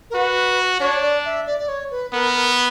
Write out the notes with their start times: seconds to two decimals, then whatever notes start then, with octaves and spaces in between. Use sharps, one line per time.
0.10 A#4
0.14 F#4 B4
0.80 D4 C#5
1.02 D5
1.25 E5
1.47 D5
1.60 D5
1.68 C#5
1.91 B4
2.13 B3 A#4
2.35 A#4